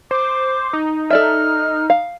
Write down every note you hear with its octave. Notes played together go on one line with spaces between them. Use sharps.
C5 D6
D#4
A4 D5 E5 F6
F5